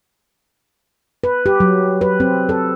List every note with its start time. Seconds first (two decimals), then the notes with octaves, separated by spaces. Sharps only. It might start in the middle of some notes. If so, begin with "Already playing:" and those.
1.24 B4
1.46 G4
1.60 F#3
2.01 B4
2.20 C4
2.49 A4